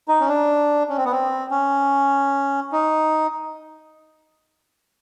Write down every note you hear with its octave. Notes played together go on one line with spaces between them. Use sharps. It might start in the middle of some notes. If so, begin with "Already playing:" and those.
D#4
C#4
D4
C#4
C4
B3
C4
C#4
D#4